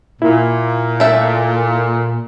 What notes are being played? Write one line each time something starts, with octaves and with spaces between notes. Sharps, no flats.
A#2 E4
A3 E5